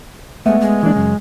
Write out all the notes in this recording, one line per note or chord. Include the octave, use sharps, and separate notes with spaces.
G#3 A3 B3 E5
G#3
E3 A#3 D4
F#2 C#3